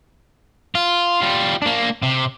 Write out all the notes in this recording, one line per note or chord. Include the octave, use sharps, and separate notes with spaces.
F4
G3 F4
A#3 D4
C3